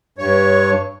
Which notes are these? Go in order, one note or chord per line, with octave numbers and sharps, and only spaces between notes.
G2 C#5